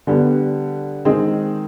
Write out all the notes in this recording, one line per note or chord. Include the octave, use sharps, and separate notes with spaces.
D3 G3 B3
D#3 G#3 C4 D#4 G#4